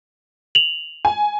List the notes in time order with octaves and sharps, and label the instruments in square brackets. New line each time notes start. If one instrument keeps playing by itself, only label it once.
[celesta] F7 F#7
[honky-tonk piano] G#5